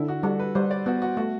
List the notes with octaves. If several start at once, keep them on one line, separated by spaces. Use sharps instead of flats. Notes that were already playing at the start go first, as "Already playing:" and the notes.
Already playing: D3 E4
F#4
G3 A4
B4
G3 C5
D5
B3 F#4
F#4
A3 F#4